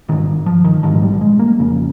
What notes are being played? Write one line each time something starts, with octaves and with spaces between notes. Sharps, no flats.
G#1 G2 D#3
F3
D#3
A#1 G#2 F3
G3
G#3
A#3
F1 F2 C#3